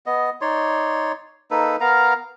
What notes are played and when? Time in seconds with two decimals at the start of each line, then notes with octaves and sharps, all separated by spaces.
0.06 B3 D#5
0.41 D#4 C#5 D5 C6
1.51 A#3 D#4 A4 B4
1.81 B3 A#4 F5 A#5